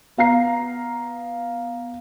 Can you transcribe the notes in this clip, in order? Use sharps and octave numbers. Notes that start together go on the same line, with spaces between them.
B3 F5 A#5 C7